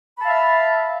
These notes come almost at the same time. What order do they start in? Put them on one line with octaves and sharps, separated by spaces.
B5 A5 F5 E5